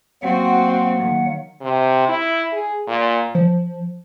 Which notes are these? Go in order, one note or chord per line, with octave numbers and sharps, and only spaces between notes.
F#3 A#3 C4 F#4 F#5
D#3
C3
E4
G#4
A#2
F3